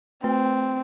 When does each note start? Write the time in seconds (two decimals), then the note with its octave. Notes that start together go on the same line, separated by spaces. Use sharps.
0.24 A3 C4 B4